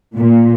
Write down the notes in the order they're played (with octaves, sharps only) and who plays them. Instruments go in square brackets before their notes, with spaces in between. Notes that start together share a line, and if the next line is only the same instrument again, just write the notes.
[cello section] A#2